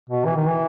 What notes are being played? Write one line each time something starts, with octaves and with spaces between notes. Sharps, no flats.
B2
E3
D#3
E3